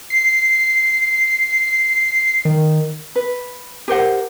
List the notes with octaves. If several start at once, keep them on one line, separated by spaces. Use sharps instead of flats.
C7
D#3
B4
G4 A#4 C5 F#5